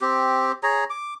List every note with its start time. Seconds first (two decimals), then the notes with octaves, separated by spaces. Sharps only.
0.01 C4 G4
0.63 G#4 C#5 A#5
0.90 D6